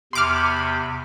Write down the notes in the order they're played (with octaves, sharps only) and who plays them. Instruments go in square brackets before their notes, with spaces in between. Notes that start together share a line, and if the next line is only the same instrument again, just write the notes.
[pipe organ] E2 C3 B5 [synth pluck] C6 D6 F6